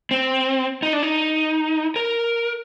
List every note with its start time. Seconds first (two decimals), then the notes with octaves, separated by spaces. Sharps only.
0.11 C4
0.83 D#4
0.93 D4
1.03 D#4
1.96 A#4